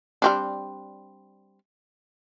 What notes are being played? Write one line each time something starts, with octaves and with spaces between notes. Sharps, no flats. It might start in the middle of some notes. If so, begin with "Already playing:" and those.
G3 C4 D4